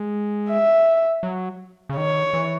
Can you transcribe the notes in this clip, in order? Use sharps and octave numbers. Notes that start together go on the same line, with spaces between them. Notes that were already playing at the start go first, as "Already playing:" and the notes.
Already playing: G#3
E5
F#3
C#3
D#3 C#5
E3